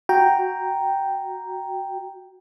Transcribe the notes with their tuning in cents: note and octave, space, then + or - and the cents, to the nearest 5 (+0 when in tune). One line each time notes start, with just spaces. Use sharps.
F#4 +0 G5 +0 A#5 +0